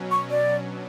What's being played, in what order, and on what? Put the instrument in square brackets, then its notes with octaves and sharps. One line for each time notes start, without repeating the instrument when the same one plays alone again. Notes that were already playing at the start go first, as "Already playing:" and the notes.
Already playing: [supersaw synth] B2 F#3 C#4
[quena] C#6
D5
[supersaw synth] B2 F#3 B3 D4